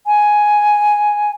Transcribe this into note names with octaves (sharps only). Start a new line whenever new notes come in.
G#5